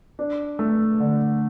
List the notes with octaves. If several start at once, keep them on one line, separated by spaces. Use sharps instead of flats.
D4
A3
D3